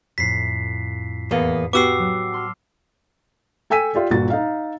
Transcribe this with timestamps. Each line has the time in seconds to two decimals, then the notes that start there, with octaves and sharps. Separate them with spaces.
0.18 F2 A2 B6 C7
1.31 E2 A#3 B3
1.73 B3 F#4 G4 D6 E6 C7
1.99 F#3
2.32 A5 C6 F6
3.70 A4 G5 G#5 E6 B6 D#7
3.95 F4 G4 D5
4.10 G1 A#2 F#4 A6
4.30 D#4 F5